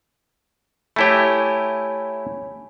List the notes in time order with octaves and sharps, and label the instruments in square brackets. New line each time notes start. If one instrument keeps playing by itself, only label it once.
[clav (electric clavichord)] A3 E4 G4 [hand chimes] C#5 G#5 B5